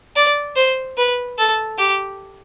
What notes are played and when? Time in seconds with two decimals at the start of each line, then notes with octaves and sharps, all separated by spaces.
0.16 D5
0.56 C5
0.97 B4
1.38 A4
1.78 G4